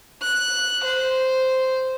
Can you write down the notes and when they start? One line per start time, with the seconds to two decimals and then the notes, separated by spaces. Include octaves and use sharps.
0.22 F#6
0.85 C5